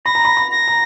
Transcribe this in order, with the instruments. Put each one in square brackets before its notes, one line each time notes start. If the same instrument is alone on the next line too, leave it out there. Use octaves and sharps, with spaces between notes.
[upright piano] B5 [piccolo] A#6
[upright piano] A#5
B5
B5
[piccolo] A#6
[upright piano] A#5